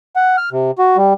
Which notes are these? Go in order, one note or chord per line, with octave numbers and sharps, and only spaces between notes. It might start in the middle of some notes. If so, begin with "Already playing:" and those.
F#5
F6
C3
F#4
G3